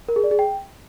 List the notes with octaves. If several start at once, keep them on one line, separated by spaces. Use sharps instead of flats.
A#4
G#4
D5
G#4
G5